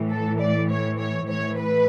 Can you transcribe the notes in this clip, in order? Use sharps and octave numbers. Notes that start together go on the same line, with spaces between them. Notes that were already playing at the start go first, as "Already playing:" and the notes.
Already playing: A2 E3
A4
D5
C#5
C#5
A2 E3 C#5
B4